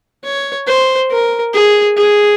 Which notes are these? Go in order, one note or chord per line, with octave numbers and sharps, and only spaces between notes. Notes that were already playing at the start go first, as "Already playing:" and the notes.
C#5
C5
A#4
G#4
G#4